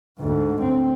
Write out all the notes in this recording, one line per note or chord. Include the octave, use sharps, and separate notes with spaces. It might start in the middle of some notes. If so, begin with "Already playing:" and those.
D2 G#2
C4